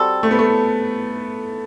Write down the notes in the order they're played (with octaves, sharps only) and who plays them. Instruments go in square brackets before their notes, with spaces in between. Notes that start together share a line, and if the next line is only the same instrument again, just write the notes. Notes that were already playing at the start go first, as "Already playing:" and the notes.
Already playing: [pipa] G3 C4 F#4 A4
[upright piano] A3
B3
A3